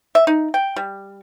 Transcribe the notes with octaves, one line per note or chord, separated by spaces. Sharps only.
E5
D#4
G5
G3